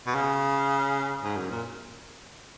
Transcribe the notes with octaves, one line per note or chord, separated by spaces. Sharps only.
B2
C#3
G#2
F#2
A#2